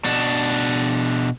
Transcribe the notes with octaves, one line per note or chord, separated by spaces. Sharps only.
B2 D4